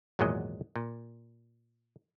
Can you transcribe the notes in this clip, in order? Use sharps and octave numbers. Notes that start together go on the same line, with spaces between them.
G#1 E2 A#2 F#3 G#3 D#5
A#2